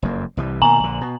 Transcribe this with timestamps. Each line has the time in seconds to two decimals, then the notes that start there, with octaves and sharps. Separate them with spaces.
0.02 F#1 F2 A#3
0.37 C2 E3 G3
0.62 B2 D#3 A#3 G#5 A#5 F#7
0.80 A#1 D3
1.01 B2